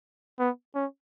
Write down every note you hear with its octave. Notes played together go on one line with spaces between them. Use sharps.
B3
C#4